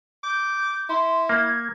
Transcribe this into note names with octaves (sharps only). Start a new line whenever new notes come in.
D6 G6
E4 C6
A#3 G#6